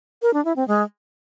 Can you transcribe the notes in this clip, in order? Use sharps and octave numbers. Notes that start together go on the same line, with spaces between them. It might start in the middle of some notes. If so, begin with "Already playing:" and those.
A#4
D4
E4
C4
G#3